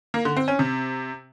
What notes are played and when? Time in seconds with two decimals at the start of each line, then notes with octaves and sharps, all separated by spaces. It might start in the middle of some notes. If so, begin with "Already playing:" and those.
0.14 A#3
0.25 D3
0.37 C4
0.48 C#4
0.59 C3